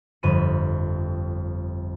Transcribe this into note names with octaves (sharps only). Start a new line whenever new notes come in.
G1 F2 B5 B6 D#7